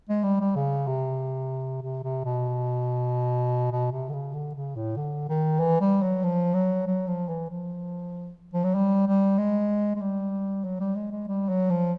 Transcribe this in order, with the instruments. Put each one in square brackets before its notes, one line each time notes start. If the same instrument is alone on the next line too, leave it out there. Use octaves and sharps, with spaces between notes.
[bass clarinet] G#3
G3
G3
C#3
C3
C3
C3
B2
B2
C3
D3
C#3
D3
C#3
A2
D3
D#3
E3
G3
F#3
F3
F#3
F#3
F3
E3
F3
F3
F#3
G3
G3
G#3
G#3
G3
F#3
G3
G#3
G#3
G3
F#3
F3